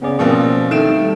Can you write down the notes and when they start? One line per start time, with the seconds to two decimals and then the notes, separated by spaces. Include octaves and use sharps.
0.02 C#3 B3 C#4 D5
0.19 B2 F3 A#3 C4
0.71 D#3 A3 D7 E7
0.88 G3